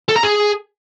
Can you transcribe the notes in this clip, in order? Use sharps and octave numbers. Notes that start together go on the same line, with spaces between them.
A4
A#5
G#4